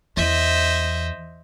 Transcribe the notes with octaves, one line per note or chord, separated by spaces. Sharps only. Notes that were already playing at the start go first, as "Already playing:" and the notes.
E2 C5 D#5 E5